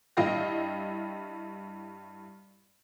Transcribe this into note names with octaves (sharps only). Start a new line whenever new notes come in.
G2 E4 D#5 F5 G5 A#6